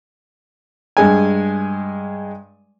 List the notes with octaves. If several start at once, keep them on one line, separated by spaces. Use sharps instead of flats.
G2 G#3 G#5